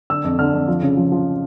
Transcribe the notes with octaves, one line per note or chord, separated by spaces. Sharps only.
D3 E6
F2
D3 F6
F2
F3
C#3
F3
F3